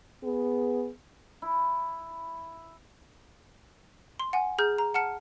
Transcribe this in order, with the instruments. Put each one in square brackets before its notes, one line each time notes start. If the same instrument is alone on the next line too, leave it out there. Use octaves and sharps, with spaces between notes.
[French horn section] B3 G#4
[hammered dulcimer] E4
[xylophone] C6
F#5 G#5
G#4 A#5 F6 G6
A#5
F#5 A5 F6 C#7